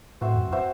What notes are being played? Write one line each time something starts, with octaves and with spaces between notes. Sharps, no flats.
A2 C4 F#4 C5 E5
F#2
C4 F#4 C5 E5